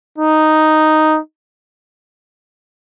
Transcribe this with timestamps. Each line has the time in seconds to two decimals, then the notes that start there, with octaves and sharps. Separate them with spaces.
0.18 D#4